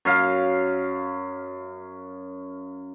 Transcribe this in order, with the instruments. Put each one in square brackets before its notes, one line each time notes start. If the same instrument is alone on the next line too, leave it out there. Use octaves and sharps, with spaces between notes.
[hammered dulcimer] F#2 F5